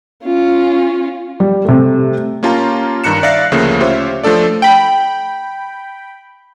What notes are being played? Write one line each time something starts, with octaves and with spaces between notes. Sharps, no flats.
C#4 F4
G3
C3 A3
A#3 C#4 F4 G4 A5 A#5
G2 D#3 A#5 F#6 C#7 E7
D5 E5 F5 F#6 A#6 C7
D2 C#3 F3 A3 A#3
C#4 F4 G4 C5 C#5 E5
F3 A3 D4 A4 D5
G5 B5